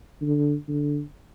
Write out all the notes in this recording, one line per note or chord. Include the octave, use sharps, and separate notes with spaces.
D3
D3